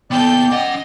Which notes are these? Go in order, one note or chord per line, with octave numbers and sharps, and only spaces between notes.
D#2 B3 A4 D5 G5 G6
C#4 D#5 F#5